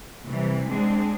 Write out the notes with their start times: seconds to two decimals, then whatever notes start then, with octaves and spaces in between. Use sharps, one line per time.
0.25 C3 E3 G3
0.67 G#3 C4 D4 G#4